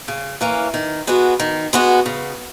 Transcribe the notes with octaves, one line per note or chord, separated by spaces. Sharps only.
C#3
E3 A#3 C#4
D#3
G#3 B3 F#4
D#3
G#3 B3 F#4
C#3